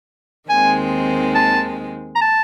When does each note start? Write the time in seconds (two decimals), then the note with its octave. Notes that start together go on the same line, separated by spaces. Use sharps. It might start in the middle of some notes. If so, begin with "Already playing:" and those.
0.49 D#2 D#3 G#3 C4 G#5
1.35 A5
2.16 A#5
2.21 A5